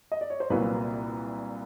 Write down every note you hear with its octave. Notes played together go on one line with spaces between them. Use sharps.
D#5
D5
C#5
C5
C2 A#2 F#3 A#3 B4